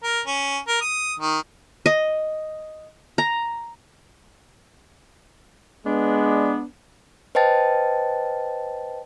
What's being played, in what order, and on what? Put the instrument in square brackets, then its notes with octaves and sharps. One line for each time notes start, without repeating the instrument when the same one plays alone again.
[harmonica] A#4
C#4
A#4
D#6
D#3
[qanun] D#5
A#5
[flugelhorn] G#3 [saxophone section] B3 D4
[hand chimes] B4 C5 D#5 G5 A5 A6